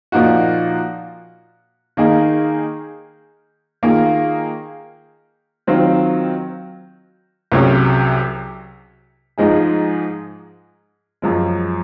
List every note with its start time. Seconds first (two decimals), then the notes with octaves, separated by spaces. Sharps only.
0.12 A#2 F3 A#3 D#4 F#4
1.97 D#3 A#3 D#4 G#4
3.83 D#3 A#3 F4 G#4
5.67 D#3 F#3 C4 F4
7.52 C2 C3 F#3 C#4 G#4
9.38 G#2 F3 G#3 D#4 G#4
11.22 F#2 F3 G#3